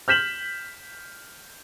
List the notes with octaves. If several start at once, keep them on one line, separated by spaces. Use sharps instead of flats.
F6 G6 B6 E7 F#7